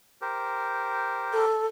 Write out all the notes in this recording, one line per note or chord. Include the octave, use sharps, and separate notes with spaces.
G4 A#4 C5
A4